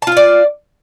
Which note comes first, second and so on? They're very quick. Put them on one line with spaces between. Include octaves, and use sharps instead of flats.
A5 F4 F5 D5